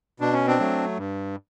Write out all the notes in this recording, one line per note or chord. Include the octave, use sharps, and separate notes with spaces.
B2 D4
C#4
C4 D4
F#3 A3
G2